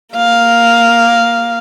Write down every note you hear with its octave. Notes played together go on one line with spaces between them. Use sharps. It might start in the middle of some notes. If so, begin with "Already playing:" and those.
A#3 F5